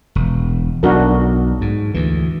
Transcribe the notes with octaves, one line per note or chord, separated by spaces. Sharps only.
E1
B1 D4 F#4 A#4
G#2
D2 E3